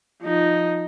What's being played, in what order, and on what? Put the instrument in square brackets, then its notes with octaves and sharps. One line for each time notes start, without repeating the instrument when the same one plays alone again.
[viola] F3 D#4